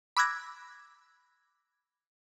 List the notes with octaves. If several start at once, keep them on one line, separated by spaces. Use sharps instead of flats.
B5 D6 E6 F#6 G#6 A#6